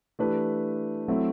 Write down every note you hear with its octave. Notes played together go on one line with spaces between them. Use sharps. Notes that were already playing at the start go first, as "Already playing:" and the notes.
E3 A3 D4 G4 B4
F#3 A3 C4 E4 A4